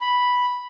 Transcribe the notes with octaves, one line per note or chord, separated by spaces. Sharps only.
B5